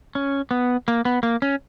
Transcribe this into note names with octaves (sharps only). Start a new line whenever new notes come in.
C#4
B3
A#3
B3
A#3
C#4